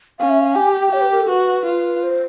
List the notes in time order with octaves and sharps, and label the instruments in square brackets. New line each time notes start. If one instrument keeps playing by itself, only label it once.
[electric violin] C#4 [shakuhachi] F5
[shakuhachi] E5
F5
[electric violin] G4 [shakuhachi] G#5
[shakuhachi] G5
[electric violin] G4 [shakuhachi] C#5
[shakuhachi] B4
A#4
A4
[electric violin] F#4 [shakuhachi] B4
[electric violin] F4
[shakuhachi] C5